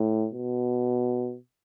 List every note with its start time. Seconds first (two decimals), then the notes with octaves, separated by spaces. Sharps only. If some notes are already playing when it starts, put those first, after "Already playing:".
Already playing: A2
0.34 B2